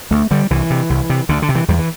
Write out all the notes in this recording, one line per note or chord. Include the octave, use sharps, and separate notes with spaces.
D2 A3
D3 G3
C2 E3
C3
C2
C3
D2 D3
D3
C3
E3
E2 G3
E3